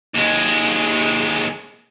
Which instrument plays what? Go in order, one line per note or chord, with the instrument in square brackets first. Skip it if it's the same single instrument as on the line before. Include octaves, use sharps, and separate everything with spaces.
[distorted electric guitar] D#2 G#3